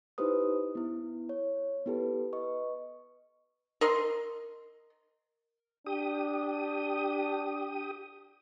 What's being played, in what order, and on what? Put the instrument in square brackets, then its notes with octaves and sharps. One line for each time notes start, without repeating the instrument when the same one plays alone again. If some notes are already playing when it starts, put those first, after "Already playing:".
[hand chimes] D#4 E4 G4 B4 C5 D#6
B3 E4
C#5
B3 E4 G4 A4 B4
B4 D#5 C#6
[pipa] A#4 D#5 C6
[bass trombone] D4 [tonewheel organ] G4 D#6